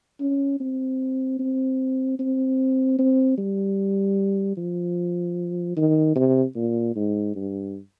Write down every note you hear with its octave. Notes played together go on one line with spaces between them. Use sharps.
C#4
C4
C4
C4
C4
G3
F3
D#3
C3
A#2
G#2
G2